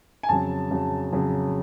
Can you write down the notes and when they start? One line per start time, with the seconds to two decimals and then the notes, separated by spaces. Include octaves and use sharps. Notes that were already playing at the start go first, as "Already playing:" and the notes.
0.23 G#5
0.29 F2 C#3 F#3 A5
0.70 F2 C#3 F#3
1.12 F2 C#3 F#3